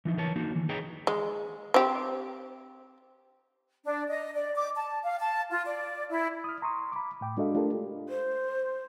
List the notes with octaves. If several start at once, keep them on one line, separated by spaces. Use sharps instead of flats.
E3 F3 D#4
E3 A#4 B4 C#5 A5
A#3 D#4 F#4
D#3 E3
G#4 B4 C#5 D#5 G5 A#5
G#3
C4 G4
D4
D#5
D5
D6
A5
F5
A5
F4
D5
E4
D#6 F6
A#5 C6 C#6 D#6
B5 D6
A2 G5 D6
G#3 D4 F#4 A4 D#5 F5
A3 D4 F4 G4 A4 A#4
C5